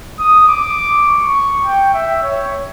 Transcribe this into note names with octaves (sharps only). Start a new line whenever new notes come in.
D#6
D6
C#6
G5
E5
C#5